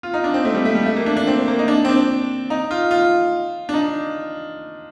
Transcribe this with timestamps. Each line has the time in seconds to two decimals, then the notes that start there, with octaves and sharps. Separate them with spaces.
0.03 F4
0.14 D#4
0.24 D4
0.34 C4
0.45 A3
0.55 G3
0.65 A3
0.75 G3
0.86 A3
0.97 A#3
1.06 D4
1.17 D4
1.27 C4
1.48 A#3
1.59 D#4
1.68 D4
1.85 C4
1.89 D4
2.50 D#4
2.71 F4
2.91 F4
3.69 D4
3.74 D#4